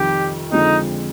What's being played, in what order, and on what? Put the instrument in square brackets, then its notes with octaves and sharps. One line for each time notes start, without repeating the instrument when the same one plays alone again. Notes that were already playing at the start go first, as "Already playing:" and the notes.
Already playing: [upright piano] F2 C3 D#3 G3 [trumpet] G4
[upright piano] F2 D3 F3 G#3 C4 [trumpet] D#4